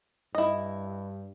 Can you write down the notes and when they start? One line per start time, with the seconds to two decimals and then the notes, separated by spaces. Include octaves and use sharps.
0.35 G2 E4 D#5